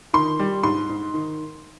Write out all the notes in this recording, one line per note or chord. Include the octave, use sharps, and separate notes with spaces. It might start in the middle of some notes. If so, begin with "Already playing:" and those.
D#3 C6
G3
G#2 C6
G#2
D#3